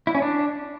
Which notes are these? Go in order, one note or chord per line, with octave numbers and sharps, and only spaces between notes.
E4
C#4
D4